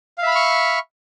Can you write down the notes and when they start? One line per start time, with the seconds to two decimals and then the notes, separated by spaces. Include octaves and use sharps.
0.18 F5
0.22 E5
0.27 B5
0.31 F6
0.36 C#6